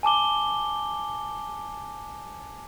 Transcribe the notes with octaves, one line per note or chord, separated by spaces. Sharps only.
G#5 A5 D6 G7